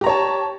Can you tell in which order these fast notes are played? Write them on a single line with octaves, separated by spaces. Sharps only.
G4 A#5 C#5 A5